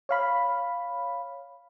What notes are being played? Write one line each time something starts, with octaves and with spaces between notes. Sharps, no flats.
C#5 F5 B5